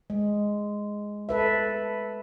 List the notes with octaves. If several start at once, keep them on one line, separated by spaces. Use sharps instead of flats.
G#3
A4 B4 E5